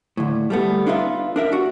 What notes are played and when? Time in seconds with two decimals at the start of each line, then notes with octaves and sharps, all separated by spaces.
0.17 A2 D3
0.50 G3 A3 B3
0.86 D4 D#4 F4 B4 E5
1.36 D4 A#4 E5
1.52 D4 F#4